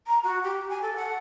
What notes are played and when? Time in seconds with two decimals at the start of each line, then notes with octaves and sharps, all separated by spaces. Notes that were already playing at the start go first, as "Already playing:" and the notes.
0.07 A#5
0.24 F#4
0.43 G4
0.69 G#5
0.82 A4
0.96 F#5